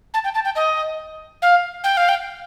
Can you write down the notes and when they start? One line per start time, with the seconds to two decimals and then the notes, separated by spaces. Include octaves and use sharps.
0.14 A5
0.24 G5
0.35 A5
0.45 G5
0.56 D#5
1.42 F5
1.84 G5
1.97 F5
2.09 G5